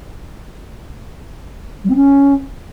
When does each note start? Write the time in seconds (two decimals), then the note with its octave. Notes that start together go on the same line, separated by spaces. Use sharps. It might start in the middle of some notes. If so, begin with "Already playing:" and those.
1.84 G3
1.90 C4
1.95 C#4